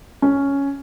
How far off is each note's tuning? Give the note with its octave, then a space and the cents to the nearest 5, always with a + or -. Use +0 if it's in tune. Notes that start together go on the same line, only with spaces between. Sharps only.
C#4 +5